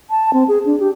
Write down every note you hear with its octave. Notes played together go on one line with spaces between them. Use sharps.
A5
C4
G#4
D4
G4